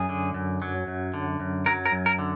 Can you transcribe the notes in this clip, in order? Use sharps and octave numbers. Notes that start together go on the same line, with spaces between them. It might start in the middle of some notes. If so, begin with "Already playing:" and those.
Already playing: F#2 G#4
D3
F#2
F#3
F#2
D3
F#2
F#3 A#4
A#4
F#2
A#4
D3